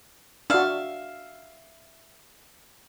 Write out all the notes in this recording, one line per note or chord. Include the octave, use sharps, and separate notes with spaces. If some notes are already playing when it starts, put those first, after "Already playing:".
D4 F#4 E5 F5